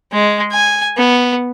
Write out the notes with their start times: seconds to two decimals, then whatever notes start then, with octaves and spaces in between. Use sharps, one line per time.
0.12 G#3
0.52 G#5
0.98 B3